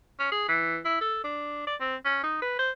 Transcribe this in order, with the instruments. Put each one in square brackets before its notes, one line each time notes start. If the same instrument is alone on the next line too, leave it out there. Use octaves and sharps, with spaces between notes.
[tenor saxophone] C#4
G#4
E3
E4
A4
D4
D5
C4
C#4
D#4
B4
C5